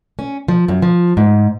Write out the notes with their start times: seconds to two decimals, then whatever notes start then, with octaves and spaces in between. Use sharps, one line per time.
0.19 C#4
0.48 F3
0.68 F#2
0.82 F3
1.17 G#2